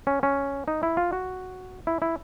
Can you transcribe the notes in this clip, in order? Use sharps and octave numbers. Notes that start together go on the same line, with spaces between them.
C#4
C#4
D#4
E4
F4
F#4
E4
E4